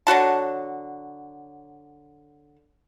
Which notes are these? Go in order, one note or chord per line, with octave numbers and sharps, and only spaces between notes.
D3 F#3 F#4 A5